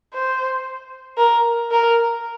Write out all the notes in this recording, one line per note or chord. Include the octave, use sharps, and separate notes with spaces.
C5
A#4
A#4